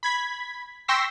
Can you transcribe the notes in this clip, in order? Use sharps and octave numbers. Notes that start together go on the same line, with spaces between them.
B5 G#6 B6
G5 C6 C#6 E6 A#6 B6